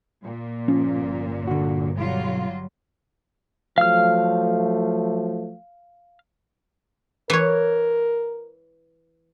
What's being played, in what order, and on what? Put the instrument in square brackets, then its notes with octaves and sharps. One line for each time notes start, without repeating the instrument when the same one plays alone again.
[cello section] A#2
[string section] G1 [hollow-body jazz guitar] F3 [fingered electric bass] C#4
[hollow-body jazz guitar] D3 F#4
[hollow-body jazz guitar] B1 [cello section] F#3 G3 F4
[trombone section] F3 F#3 A3 [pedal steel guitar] F5 F6
[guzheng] E3 C#5 [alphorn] A#4